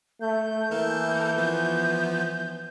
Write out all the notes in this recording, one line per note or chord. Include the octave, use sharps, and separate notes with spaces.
A3 G6
E3 A#3 A4 A#4
F3 B3